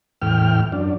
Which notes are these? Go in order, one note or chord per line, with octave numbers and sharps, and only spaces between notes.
E2 A2 G5 F6
F#2 D4